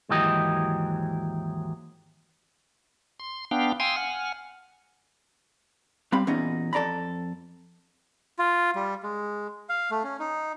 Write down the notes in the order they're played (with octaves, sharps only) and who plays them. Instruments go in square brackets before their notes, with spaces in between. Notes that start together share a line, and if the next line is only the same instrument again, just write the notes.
[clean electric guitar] D#2 G#2 E3 F#3 G4 D#5
[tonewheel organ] C6
B3 D4 F5 G5
F5 G5 G#5 C6 D#6 E6
F#5 G#5 F6
[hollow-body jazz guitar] G3 C4 F5 B5
E2 A#2 C#4 D#4
F2 A4 D5 A#5 B5
[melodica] F4
G3
G#3
F5
A3
C#4
D#4